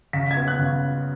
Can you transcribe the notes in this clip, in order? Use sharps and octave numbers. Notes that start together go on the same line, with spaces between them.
C#3 B6
G#6
B3
F#6
C#3